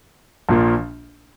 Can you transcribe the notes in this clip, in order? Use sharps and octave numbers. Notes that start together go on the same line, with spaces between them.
A#1 A#2 F3 A#3